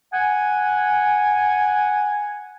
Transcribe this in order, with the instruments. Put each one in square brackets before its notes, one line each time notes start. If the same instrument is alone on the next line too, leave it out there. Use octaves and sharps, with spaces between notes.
[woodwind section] F#5 G#5